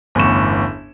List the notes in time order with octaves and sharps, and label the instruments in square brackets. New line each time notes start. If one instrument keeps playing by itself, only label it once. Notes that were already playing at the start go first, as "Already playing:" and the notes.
[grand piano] G1 E2 A2 C#4 C#6 E7